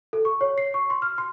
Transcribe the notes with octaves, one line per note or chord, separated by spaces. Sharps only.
A4
C#6
C#5
C7
C#6
C6
F6
C6